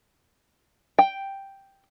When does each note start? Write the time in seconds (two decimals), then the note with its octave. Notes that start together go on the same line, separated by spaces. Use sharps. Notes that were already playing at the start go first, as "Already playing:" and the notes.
0.99 G5